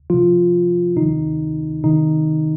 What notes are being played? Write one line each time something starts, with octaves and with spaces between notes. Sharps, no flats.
C3 F3 F4
C3 D#3 D#4
C3 D#3 D#4